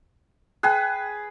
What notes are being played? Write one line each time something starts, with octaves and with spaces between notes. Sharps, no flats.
G#4 B4 G5 F#6